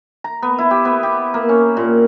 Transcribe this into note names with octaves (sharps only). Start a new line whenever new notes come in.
A#5
B3
E4
G4
B3
G4
A#3
C#4
A#2